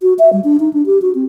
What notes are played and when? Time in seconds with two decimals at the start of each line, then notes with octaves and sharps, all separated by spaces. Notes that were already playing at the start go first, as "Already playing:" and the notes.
0.02 F#4
0.19 E5
0.33 G3
0.44 D4
0.60 D#4
0.73 D4
0.86 G4
1.02 F#4
1.15 C4